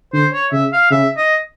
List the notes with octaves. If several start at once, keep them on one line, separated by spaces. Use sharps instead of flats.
D3 C5
C#5
C#3 E5
F5
C#3 E5
D#5